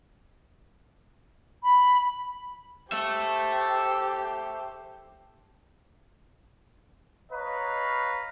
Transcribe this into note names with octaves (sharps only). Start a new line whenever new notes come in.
B5
G4 A4 C5 E5
B4 C#5 D#5 F5 A#5 B5